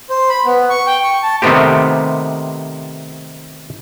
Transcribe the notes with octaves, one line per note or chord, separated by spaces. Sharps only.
C5
B5
B3
C#6
G5
C#6
A5
C3 D#3 A3 B3 C4 G4